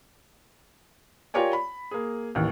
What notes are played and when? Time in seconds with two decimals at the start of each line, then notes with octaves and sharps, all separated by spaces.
1.34 F4 G4 A#4 C#5 D5 G#5
1.53 B5
1.91 A#3 G#4
2.35 A1 D#2